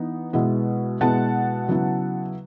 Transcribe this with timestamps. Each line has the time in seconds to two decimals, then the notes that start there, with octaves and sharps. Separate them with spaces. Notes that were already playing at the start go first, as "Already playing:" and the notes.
Already playing: E3 B3 D#4
0.33 B2 G#3 B3 E4
1.01 B2 G#3 B3 E4 F#5 A5
1.68 C#3 F#3 B3 E4